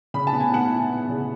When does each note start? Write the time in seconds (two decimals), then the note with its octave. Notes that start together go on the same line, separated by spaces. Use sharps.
0.14 C#3 B5
0.27 A5
0.33 B3
0.40 G#5
0.52 B3 F#5 A5
0.70 E4
0.90 B3
1.09 C#3